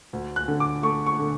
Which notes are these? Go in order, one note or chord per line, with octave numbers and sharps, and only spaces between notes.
D2
F#6
D3
D6
A3 C#6
C#6
D3